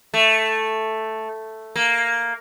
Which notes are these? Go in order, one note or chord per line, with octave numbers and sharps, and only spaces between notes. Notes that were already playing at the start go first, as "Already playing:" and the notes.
A3
A#3